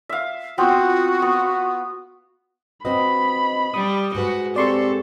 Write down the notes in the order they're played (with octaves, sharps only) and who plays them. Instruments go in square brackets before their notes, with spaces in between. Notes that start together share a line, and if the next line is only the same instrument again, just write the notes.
[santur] E5 F5
[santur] B3 C4 F4 [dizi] F#4
[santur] B3
[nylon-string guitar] C4 F#4 B4 [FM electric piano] D#5 [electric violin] B5
[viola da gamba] G3 [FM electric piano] D#6
[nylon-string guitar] G#2 G#3 B4 [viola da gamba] F#4
[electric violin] C4 G4 [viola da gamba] A4 [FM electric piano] D5 C6 C#6